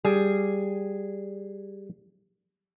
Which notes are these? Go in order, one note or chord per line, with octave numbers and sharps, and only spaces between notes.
G3 G#4